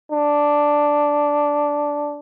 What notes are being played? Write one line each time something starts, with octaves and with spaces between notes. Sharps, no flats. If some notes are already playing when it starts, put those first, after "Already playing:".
D4